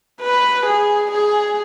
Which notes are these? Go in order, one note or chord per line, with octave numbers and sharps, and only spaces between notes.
B4
G#4
G#4